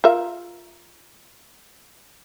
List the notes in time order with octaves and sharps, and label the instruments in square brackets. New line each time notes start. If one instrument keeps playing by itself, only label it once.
[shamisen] F4 A#4 E5